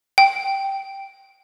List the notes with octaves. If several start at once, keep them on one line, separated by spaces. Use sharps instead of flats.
G5